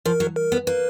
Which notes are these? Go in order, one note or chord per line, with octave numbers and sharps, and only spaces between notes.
F3 A#4
F#3
A#4
B3
A#3 B4